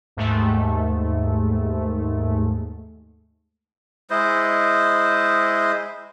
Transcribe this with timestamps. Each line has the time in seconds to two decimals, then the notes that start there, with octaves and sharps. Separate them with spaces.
0.17 D#2 G#2 A3
4.10 G#3 E4 C5 D#5